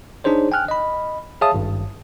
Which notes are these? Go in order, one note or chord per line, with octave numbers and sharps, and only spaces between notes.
D4 D#4 G#4 C5 C#5
G5 G#5 F6 F#6
D#5 B5
G#4 C#5 E5 F5 A5 D#6
G#1 G2